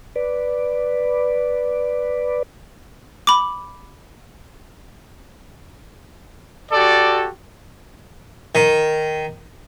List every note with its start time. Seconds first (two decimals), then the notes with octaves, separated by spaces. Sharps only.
0.16 B4 D5
3.27 B5 D6
6.72 F#4 G4 A4 D5
8.55 D#3